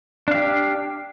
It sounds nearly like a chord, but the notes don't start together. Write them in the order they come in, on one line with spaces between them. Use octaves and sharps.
D4 F5 G4